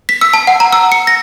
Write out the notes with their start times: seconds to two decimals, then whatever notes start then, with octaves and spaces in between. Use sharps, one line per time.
0.09 B6
0.21 E6
0.34 A5
0.47 F#5
0.60 A#5
0.72 E6
0.92 C#7
1.07 A#6